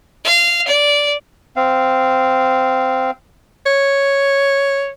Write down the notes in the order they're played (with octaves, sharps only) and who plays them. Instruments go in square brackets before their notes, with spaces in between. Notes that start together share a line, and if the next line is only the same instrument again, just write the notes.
[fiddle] F5
D5
[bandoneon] C4 F5
[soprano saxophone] C#5